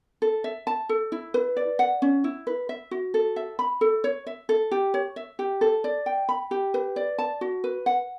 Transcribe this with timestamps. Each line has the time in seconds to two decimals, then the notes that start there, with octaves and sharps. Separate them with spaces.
0.22 A4
0.44 E5
0.67 A5
0.89 A4
1.12 E4
1.34 B4
1.57 D5
1.79 F#5
2.02 C#4
2.24 E4
2.47 B4
2.69 E5
2.91 F#4
3.14 A4
3.36 E5
3.59 B5
3.81 A4
4.04 C#5
4.27 E5
4.49 A4
4.71 G4
4.94 C#5
5.16 E5
5.39 G4
5.61 A4
5.84 D5
6.06 G5
6.29 B5
6.51 G4
6.74 B4
6.96 D5
7.19 A5
7.41 F#4
7.64 B4
7.86 F#5